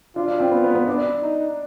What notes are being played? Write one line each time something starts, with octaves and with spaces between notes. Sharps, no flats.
D4 F4
D4
C4
B3
B3
B3
D4
D#4